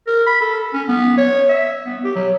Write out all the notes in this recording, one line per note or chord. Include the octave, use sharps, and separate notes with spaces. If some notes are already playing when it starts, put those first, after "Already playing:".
A#4
B5
A4
C#4
B3
C#5
E5
B3
G4
F#3